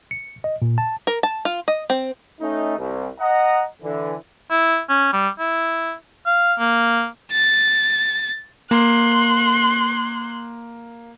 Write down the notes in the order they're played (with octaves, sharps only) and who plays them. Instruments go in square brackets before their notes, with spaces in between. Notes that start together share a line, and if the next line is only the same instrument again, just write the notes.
[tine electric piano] C#7
D#5
A#2
A5
[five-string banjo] A#4
A5
F4
D#5
C4
[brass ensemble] A3 C#4 D#4
C2
D#5 F#5 A#5
D3 E3
[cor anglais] E4
C#4
G3
E4
F5
A#3
[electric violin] A6
[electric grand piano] A#3 [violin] C6 F#6